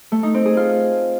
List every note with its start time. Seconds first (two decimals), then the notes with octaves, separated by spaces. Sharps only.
0.12 A3
0.23 D#4
0.34 C4
0.46 G#4
0.57 F4